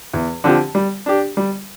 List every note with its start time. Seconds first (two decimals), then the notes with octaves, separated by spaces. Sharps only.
0.14 E2
0.44 D3 F3 C4 G4
0.75 G3
1.06 D4 G4
1.37 G3